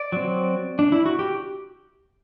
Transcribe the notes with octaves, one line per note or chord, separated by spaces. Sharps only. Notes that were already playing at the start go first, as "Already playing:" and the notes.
Already playing: D5
F#3 C4
D4
E4
F#4
G4